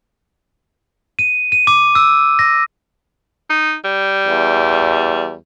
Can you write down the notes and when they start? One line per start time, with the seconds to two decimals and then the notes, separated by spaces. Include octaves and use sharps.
1.19 D#7
1.52 D#7
1.67 D6
1.95 E6
2.39 A#6
3.50 D#4
3.85 G3
4.27 E2